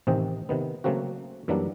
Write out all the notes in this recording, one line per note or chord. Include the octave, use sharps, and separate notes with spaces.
A1 C3 D#3 C4 D#5 G5
C3 D#3 B3
C#3 F#3 A3 A#3 C4 F#4
F#2 E3 F#3 G3 A#3 D4